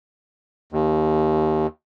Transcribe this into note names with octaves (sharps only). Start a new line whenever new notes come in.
D#2